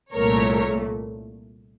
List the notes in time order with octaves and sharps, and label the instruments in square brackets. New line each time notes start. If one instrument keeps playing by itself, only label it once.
[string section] C2 A#2 A3 A#4 C#5